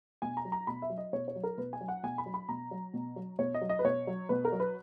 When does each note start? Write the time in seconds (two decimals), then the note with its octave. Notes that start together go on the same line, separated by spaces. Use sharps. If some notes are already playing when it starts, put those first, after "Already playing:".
0.22 B2 G#5
0.37 A#5
0.45 F#3
0.52 A#5
0.67 B2 B5
0.82 E5
0.90 F#3
0.98 D#5
1.13 B2 C#5
1.28 C#5
1.36 F#3
1.44 A#4
1.58 B2 B4
1.73 G#5
1.81 F#3
1.88 F#5
2.03 B2 G#5
2.18 B5
2.26 F#3
2.34 B5
2.49 B2 A#5
2.71 F#3
2.94 B2
3.16 F#3
3.39 B2 C#5
3.54 D#5
3.61 F#3
3.69 D#5
3.79 B4
3.84 B2 C#5
4.07 F#3
4.29 B2 B4
4.45 A#4
4.52 F#3
4.60 B4